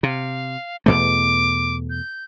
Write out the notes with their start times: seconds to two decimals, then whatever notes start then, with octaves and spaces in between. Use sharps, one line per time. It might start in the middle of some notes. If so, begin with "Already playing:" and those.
0.03 C3 F5
0.86 E2 B2 A3 D6
1.90 G6